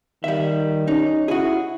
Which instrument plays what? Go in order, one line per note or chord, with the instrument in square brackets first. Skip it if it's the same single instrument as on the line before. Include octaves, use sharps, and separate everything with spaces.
[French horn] D#3 [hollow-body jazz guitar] G3 E5
[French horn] C#4 [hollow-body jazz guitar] D#4
[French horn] E4 [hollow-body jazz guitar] F#4 G#4